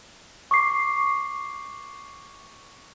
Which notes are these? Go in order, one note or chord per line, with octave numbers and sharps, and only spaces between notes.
C#6 D6 C7